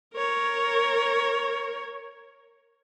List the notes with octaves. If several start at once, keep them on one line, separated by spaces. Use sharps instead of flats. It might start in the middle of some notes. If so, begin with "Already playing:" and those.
A#4 C#5